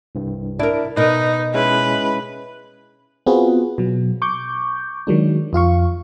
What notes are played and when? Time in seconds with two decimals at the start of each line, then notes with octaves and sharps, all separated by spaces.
0.15 C2 G2
0.59 D4 E4 A#4 D5
0.97 B2 D#4 A#4 B4
1.54 G#3 C#4 E4 B4
3.26 B3 C4 F4 F#4 G#4 B4
3.78 B2 F#3
4.22 C#6 D6 G6
5.07 D#3 F#3 G#3 D4
5.53 F2 F4 F5 C#6